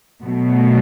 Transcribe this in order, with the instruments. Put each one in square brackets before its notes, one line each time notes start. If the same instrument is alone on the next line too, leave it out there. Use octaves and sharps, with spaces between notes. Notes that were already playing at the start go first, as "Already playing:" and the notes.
[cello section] B2 F#3 A3